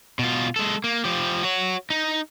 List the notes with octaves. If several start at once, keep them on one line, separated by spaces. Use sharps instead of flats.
B2 F4
G#3 A4
A#3
F3 G4
F#4 C#5
D#4